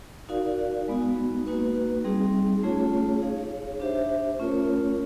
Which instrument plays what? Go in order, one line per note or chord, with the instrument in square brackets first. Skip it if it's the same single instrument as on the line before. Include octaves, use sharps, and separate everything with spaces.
[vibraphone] D#4 F#4 A#4 D5 F5
G#3 B3 D#4 F#4
A#3 D#4 F#4 B4
G3 C4 D#4 G#4
A3 C#4 F4 G#4 C#5
D#4 G#4 C#5 F5
D4 G4 C5 E5
A3 C#4 F4 A#4 C#5